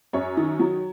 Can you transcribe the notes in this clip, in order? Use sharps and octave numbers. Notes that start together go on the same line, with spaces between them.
F#2 C#5
D#3
F#3